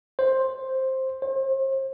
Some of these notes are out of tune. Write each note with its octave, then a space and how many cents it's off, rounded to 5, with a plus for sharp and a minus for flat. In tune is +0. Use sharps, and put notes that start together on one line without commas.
C5 +10
C5 +40